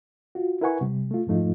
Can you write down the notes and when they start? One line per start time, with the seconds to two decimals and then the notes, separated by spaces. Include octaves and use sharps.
0.35 F4 F#4
0.61 E4 A#4 B4 F#5 G#5 C#6
0.81 C3 G3
1.11 A3 F4
1.26 F2 G#2 F3 A3 D#4 F4